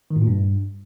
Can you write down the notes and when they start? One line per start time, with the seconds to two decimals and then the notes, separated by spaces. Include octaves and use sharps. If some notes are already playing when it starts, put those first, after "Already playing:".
0.10 D#3
0.16 A2
0.22 A#2
0.27 G2